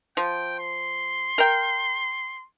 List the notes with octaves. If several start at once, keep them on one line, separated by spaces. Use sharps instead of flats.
F3 G5
C6
A#4 G5